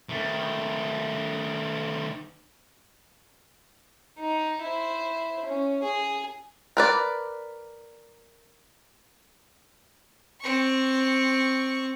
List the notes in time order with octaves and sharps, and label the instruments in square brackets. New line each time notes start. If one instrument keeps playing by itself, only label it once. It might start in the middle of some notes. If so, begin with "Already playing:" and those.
[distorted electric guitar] D#3 A3
[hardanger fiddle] D#4
E4 C5
C#4
G#4
[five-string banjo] A#4 B4 D5
[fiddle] C4 C#6